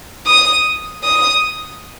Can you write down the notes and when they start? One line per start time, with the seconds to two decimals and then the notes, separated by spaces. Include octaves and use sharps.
0.27 D#6
1.04 D#6